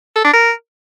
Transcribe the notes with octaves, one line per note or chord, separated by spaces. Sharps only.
A4
D4
A#4